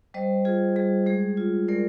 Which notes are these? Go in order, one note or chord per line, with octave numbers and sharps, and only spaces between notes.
G3 C5 D#5
F4 G#4 C5
G3 G#4
G#3 G#4
F4
G#3 A#4 D5